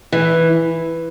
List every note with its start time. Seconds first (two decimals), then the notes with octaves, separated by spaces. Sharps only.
0.12 E3